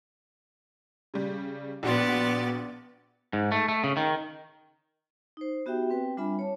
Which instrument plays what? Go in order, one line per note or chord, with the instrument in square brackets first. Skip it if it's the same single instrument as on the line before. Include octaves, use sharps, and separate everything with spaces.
[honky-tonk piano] C#3 G3
[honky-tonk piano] A#1 F#4 C6 [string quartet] B3 D5
[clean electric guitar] G#2
A3
A3
C#3
D#3
[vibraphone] D#4 C5
B3 F#4 G4 E5 G5
C4 B4 G5
G3 D4 F4 E5 G#5 B5
C#5 A5